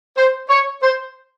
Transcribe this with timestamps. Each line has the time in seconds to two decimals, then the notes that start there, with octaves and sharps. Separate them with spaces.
0.17 C5
0.49 C#5
0.83 C5